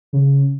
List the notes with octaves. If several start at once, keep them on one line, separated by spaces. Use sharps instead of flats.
C#3